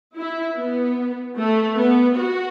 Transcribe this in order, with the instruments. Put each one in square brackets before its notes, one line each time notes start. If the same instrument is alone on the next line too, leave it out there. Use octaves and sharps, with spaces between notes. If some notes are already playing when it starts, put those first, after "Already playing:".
[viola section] E4
B3
A3
B3
F#4